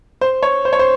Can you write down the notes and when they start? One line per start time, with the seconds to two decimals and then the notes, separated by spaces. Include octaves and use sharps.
0.21 C5
0.42 C#5
0.65 C5
0.73 C#5
0.79 C5